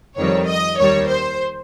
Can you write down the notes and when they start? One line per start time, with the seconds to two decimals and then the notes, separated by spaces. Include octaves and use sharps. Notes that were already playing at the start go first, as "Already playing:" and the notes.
0.17 F2 D#3 G3 C#5
0.48 D#5
0.79 D#2 D#3 G3 C#5
1.10 C5